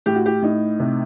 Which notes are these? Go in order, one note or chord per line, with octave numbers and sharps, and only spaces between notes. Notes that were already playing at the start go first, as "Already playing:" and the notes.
A2 G4
F#4
G4
A2 D#4
C3